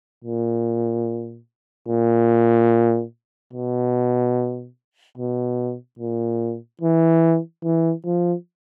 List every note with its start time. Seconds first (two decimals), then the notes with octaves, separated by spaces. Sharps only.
0.24 A#2
1.88 A#2
3.53 B2
5.17 B2
5.99 A#2
6.81 E3
7.64 E3
8.05 F3